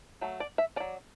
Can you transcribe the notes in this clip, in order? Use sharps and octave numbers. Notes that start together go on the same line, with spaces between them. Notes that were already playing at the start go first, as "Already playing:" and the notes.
F#3 A3
D5
E5
F#3 C#4 D5